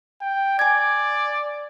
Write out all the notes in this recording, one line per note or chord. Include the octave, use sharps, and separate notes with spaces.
G5
D5 G#5 G#6